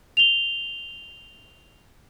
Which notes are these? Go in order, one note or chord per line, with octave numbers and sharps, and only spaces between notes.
F7 G7